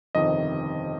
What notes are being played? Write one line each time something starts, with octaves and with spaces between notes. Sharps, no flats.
G1 F2 C3 D#3 D#5